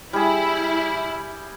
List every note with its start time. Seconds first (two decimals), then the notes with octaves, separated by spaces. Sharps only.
0.13 G3 E4 G#4